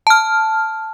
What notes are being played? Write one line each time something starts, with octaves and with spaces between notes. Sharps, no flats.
A5 F6